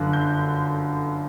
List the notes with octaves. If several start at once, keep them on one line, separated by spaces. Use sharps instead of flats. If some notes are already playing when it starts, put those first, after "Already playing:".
Already playing: G1 F#2 D3 F#6
G6